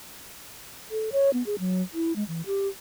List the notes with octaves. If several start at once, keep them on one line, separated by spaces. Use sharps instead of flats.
A4
C#5
B3
G#4
F#3
E4
G#3
E3
G4